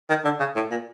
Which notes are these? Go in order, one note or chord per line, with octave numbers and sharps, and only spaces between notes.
D#3
D3
C#3
A2
A#2